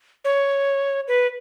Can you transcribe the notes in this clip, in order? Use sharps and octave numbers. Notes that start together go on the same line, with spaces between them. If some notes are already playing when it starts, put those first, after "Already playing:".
C#5
B4